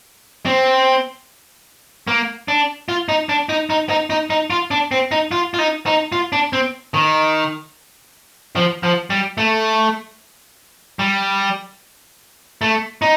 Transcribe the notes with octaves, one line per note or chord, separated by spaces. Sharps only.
C4
A#3
D4
F4
D#4
D4
D#4
D#4
D#4
D#4
D#4
F4
D4
C4
D#4
F4
F4
D#4
D#4
F4
D4
C4
D#3
F3
F3
G3
A3
G3
A3
D#4